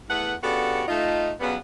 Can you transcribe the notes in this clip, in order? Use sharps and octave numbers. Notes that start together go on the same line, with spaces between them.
E2 A3 B3 F#5
C#3 B3 D4 F#4 G4 A4
A3 D#4 F4
C#3 F#3 G3 B3